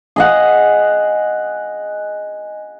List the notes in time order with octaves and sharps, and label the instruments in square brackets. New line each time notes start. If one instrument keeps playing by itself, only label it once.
[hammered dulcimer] G#4 D#5 F#5